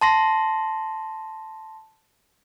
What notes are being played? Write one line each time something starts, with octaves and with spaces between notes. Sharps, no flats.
A5 C6 A#6